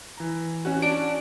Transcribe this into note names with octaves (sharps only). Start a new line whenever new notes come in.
E3 A#5
C#4 F#4
D4 D7